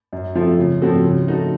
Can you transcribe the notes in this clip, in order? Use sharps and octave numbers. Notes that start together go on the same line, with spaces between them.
F#2
F3 A3 C4 F4
C#3
F3 C4 F#4 A4
C#3
A3 D#4 F#4 A4